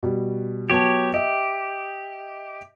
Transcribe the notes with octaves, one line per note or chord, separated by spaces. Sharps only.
B2 G3
F#3 B3 G4 C#5 A5
G4 D#5 E5